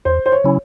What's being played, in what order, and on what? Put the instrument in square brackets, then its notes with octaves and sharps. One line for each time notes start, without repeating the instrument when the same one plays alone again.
[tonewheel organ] E2 [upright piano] C5
[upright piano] C5
C#5
[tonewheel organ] C#3 F#3 C#4 E4